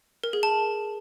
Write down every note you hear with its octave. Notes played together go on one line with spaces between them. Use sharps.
A#4
G#4
A5